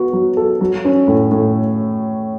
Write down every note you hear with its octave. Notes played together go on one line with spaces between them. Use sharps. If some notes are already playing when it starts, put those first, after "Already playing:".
Already playing: B3 F#4
F#3
A4
F#3
C#4
A2
A2